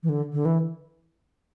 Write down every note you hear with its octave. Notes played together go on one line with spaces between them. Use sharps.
E3
D3
D3
E3